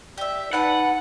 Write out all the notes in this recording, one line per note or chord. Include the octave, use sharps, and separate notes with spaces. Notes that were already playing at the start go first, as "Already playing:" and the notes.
G4 D5 E5
D#4 B4 F#5 A5